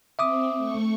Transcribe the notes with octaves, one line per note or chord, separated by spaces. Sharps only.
C4 E5 D6 D#6
A3 C#6